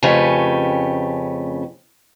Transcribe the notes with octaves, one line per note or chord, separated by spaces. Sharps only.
F2 C#3 A3 C#4 G4 B4